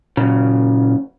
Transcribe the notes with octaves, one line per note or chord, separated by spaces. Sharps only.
F#2 A#2 C#3